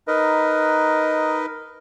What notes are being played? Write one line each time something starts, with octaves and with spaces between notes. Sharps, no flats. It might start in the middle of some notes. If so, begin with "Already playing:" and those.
D#4 A#4 B4 D#5